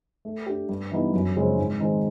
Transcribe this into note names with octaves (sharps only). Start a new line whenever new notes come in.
A3
D4 G4
G2
E3 G3 B3 D#4
F#2
C#3 F3 G#3 C4
G#2
D#3 G#3 C4 D#4